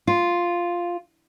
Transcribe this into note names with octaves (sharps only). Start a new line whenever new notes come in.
F4